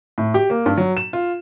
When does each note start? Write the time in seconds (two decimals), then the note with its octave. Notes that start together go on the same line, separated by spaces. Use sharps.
0.18 A2
0.34 G4
0.50 A#3
0.66 G2
0.77 F#3
0.97 E7
1.13 F4